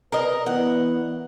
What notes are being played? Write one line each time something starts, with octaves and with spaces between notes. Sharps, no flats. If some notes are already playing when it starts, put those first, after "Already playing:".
A#4 B4 D#5
E3 B3 F#5